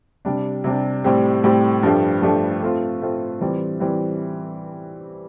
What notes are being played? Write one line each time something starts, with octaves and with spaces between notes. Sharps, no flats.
C3 G3 D4
C3 G3 D4
A2 G3 C4 G4
A2 G3 C4 G4
G2 F3 A3 D4 G4
G2 F3 A3 D4 G4
A3 C4 F4
A3 C4 F4
E3 G3 C4
E3 G3 C4